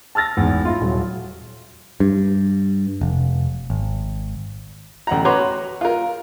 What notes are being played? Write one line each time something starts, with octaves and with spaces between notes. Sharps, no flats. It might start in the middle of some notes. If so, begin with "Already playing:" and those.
A5 E6 F6 A6 A#6
G#1 E2
E4 F4
D#1 F#3
G2
F1
G#1
A1 F#5 A#5
F#4 B4 C#5 A#5 C6 D6
F4 A#4